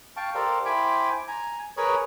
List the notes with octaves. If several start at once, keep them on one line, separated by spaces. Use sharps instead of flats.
F5 G5 A5 C#6
G4 A4 A#4 C5 D5 F5
E4 C5 G5 G#5 B5 D6
G#5 A#5
G#4 A#4 B4 C#5